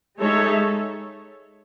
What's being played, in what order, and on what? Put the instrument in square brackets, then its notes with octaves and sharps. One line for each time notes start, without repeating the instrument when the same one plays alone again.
[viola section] G#3 D#4 A4 C#5 E5